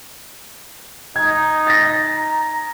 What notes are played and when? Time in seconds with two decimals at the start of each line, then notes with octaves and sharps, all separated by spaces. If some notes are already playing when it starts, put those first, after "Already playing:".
1.16 D#4 G#6
1.67 A6 A#6
2.12 A#5